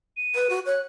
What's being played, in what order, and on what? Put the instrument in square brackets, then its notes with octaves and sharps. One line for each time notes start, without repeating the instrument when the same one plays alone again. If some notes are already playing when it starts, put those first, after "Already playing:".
[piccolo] D#7
[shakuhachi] B4
F#4
[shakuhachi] C#5 [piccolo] F#6